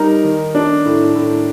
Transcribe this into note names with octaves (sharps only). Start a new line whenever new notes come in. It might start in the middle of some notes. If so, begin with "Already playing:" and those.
Already playing: G3 D#4 A#4
D#3
D4
A2
A2